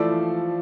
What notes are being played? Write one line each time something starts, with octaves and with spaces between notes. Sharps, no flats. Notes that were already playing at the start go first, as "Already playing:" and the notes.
Already playing: E3 F3 A3 E4 F4 A4 D5